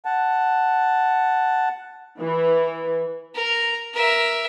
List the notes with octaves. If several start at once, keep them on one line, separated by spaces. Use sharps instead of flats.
F#5 A5
E3
A#4
A#4 E5